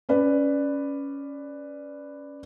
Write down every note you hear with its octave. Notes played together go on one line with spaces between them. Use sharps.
C#4 B4 D5